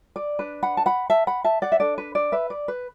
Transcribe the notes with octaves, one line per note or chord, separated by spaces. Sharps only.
D5
D4 B4
F#5 B5
A5
F#5 B5
E5 A5
F#5 B5
E5 A5
D5 F#5
E5
D4 A4 D5
B4
D5
B4 E5
D5
B4